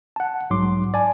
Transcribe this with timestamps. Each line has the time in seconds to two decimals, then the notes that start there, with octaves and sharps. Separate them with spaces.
0.16 F#5 A5
0.50 B1 G#2 F#3 C6 D6
0.94 D5 G#5 A5